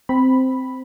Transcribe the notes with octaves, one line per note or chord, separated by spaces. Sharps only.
C4 B5